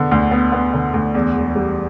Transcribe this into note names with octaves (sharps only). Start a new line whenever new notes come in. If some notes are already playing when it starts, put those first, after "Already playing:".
Already playing: D3 B3
D2
B3
B3
D3
D2
E2
E1
G3